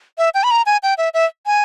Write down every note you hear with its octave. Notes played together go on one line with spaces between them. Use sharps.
E5
G5
B5
A#5
G#5
G5
E5
E5
G#5